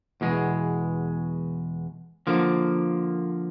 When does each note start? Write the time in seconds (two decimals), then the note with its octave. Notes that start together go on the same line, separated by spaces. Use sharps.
0.21 E2 B2 G#3
2.27 D3 F3 A#3